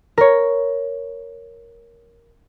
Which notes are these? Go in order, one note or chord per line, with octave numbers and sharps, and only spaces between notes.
A#4 C#5